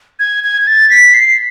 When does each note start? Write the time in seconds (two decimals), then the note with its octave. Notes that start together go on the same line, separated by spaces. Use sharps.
0.20 G#6
0.44 G#6
0.62 G#6
0.67 A6
0.90 B6
1.14 C7